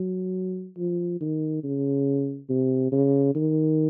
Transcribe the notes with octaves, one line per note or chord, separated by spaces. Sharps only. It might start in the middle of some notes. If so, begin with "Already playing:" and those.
Already playing: F#3
F3
D#3
C#3
C3
C#3
D#3